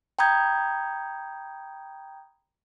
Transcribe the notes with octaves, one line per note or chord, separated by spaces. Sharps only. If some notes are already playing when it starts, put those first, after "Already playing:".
G5 A#5 B5 D#6 G6 G#6